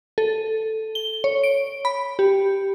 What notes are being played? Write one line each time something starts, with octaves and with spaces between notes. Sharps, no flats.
A4
G7
C#5
D7
B5
G4